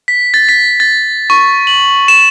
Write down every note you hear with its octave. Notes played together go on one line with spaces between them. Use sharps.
B6
A6
B6
A6
C#6
F#7
E7